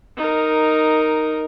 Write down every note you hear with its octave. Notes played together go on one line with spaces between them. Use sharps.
D#4 A#4